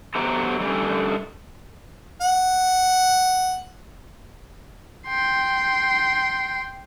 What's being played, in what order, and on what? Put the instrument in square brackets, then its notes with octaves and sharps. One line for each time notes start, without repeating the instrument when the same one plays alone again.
[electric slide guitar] F#3 A3 B3 G4 C5 A#5
D3 G3 A3 C#4
[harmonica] F#5
[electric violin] G5 C6